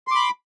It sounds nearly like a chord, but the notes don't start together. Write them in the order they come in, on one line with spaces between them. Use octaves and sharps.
C6 D6 B5